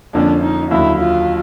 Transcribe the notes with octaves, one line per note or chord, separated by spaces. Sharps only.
F2 D3 F3 A#3 C#4 D4
D#4
D#2 D3 F#3 E4
F4